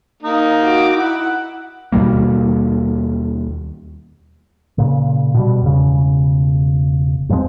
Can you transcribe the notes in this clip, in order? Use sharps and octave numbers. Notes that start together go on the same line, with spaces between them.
A#3 D#4
F#4 D6
E4 F#5
D#2 B2 G3 A#3
A#2 C#3
B2 G3
E1 C#3
G2 F3 G#3 C4